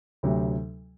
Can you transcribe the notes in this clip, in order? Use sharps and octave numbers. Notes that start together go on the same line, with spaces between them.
D2 C3 F#3 G4